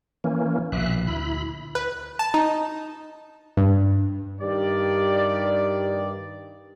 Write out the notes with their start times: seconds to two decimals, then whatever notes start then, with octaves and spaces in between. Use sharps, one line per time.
0.24 E3 A#3 C#4
0.72 A#1 B2 E5 F#6
1.07 D2 E4 B5
1.75 B4
2.19 A5
2.34 D#4
3.57 G2
4.41 G2 D#3 G4 D5